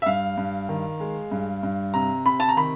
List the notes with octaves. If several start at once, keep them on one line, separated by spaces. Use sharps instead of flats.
E5
G2 F5
G2
D#3
G#3
G2
G2
C3 A#5
C3 B5
A5
A#5
D#3 B5